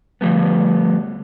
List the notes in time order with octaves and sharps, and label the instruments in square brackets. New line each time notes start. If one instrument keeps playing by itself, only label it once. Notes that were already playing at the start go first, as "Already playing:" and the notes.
[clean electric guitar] D3 F3 G3 A3 B3